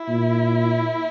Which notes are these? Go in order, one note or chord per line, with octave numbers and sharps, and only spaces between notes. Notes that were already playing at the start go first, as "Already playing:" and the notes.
Already playing: E4
A#2